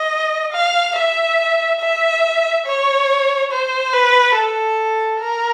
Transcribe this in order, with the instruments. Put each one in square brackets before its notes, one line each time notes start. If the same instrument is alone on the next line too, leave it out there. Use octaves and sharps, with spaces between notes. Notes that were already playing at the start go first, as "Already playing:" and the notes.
Already playing: [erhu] D#5
F5
E5
E5
C#5
C5
B4
A4
A#4